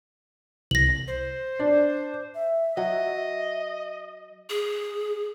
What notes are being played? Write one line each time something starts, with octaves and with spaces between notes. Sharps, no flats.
C2 A#6 F#7
C5
D4
E5
F#3 D#5
G#4